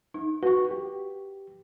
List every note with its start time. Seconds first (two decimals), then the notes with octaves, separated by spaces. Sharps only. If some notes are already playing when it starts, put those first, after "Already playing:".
0.14 D#4
0.43 F#4 B4 C#6
0.71 G4